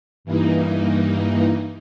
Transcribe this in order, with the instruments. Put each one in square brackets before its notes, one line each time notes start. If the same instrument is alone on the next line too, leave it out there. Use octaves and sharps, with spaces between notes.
[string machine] G2 E3 A#3 D#4